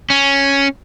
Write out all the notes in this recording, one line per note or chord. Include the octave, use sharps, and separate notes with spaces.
C#4